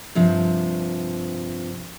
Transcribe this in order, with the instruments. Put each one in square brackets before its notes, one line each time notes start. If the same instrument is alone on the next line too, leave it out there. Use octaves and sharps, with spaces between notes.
[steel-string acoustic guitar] G2 C3 F3